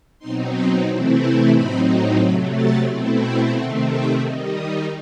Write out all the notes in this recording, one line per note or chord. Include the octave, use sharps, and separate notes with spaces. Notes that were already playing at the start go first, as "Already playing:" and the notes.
B2 F#3 C4 D#4 C6
B5
C3 E3 A3 C4 E4
C6
A2 F#3 C4 D#4 B5
C3 F#3 A3 B5
A5
B2 A3 C4 E4
G5
C3 D#3 A3 C4 F#5
E5
D#3 G3 D#4
D#5